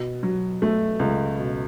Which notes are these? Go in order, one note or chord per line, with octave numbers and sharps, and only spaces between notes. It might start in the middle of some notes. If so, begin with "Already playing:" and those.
Already playing: B2
F#3
A3
C#2
B2